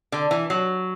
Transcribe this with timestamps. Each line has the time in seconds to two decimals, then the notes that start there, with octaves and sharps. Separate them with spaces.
0.12 D3
0.31 E3
0.50 F#3